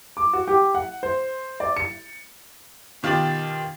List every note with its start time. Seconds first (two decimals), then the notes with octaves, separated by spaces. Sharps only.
0.17 D6
0.33 F#4
0.48 G4
0.75 F#5
1.03 C5
1.60 D5
1.76 C#7
3.03 B2 D#3 F4 G4 A6 F#7